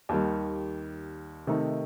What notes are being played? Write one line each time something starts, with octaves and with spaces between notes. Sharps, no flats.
D#2 D#3 G3
C3 D#3 A3 D#4